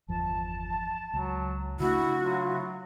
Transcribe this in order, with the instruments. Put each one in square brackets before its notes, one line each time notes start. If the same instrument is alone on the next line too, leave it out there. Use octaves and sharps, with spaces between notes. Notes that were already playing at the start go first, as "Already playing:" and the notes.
[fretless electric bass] G1 E2 F3 [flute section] A5
[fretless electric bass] C#2 [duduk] F#3
[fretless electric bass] C#3 A3 D4 [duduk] E4 [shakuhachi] F#4
[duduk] F#3 [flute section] E4 F4